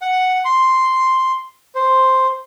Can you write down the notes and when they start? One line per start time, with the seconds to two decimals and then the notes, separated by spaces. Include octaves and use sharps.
0.02 F#5
0.45 C6
1.75 C5